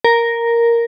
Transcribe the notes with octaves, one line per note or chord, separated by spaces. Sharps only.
A#4